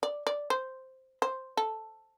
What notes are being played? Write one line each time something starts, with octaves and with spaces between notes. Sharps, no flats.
D5
D5
C5
C5
A4